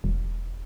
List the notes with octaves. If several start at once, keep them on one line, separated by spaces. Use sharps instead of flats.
E1